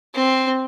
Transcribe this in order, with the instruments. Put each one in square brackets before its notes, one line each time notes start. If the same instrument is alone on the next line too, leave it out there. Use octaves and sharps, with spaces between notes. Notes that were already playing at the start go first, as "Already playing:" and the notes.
[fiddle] C4